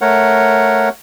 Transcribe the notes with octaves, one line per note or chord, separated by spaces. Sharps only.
A3 A#4 C#5 F#5